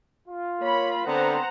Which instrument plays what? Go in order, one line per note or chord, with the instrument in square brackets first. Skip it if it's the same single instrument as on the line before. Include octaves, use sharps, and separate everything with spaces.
[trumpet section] F4
[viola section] A#3 B5 [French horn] C#5
[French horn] D3 [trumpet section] B3 C4 [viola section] C5 F#5 A#5